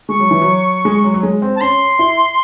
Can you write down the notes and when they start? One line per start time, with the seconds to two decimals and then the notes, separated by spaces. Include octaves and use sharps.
0.09 G#3 C#6
0.20 F#3
0.31 E3
0.42 F#3
0.85 G#3
1.04 F#3
1.14 F#3
1.23 G#3
1.42 C4
1.56 A5
1.61 C#4 C6
1.99 E4